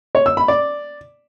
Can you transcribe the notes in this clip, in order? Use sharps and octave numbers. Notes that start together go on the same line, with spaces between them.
C#5
E6
B5
D5